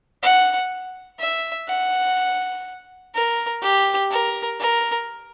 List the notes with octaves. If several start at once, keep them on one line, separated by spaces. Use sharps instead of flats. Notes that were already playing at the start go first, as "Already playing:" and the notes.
F#5
E5
F#5
A#4
G4
A#4
A#4